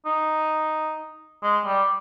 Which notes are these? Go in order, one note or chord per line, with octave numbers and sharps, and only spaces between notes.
D#4
G#3
G3